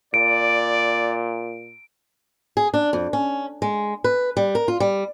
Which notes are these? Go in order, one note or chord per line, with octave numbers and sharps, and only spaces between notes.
A#2 D5 D7
G#4
D4
F2
C#4
G#3
B4
G3
A#4
F4
G3